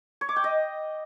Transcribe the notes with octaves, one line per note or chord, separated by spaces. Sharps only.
C#5
D6
G5
D#5